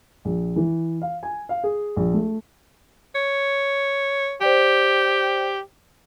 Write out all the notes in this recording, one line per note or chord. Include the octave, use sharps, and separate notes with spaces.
A#1
E3
F5
G#5
F5
G#4
A#1
A3
C#5
G4 C5 D5 G5